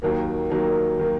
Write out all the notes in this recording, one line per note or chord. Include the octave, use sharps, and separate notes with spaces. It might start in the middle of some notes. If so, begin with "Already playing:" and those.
D#2 D#3 F#3 A#3
D#2 D#3 F#3 A#3
D#3 F#3 A#3